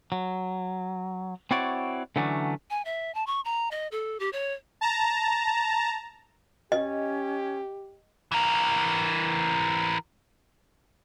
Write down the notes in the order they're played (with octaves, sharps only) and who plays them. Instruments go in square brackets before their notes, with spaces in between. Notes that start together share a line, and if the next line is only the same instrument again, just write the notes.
[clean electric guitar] F#3
C4 E4 F#4 C#5 D5
D3 E3 F#3 A3 C#4 D4
[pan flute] G#5
E5
A5
C#6
A#5
D#5
A4
G4
C#5
[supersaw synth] A5 A#5
[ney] C#4 [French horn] G4 [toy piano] D#5
[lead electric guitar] E3 A#4